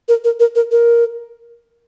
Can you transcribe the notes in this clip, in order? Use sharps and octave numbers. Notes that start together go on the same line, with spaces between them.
A#4
A#4
A#4
A#4
A#4